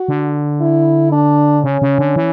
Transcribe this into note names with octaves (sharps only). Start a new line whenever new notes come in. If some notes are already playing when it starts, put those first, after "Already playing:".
Already playing: F#4
D3
E4
D4
C#3 C#4
C#3
D3
E3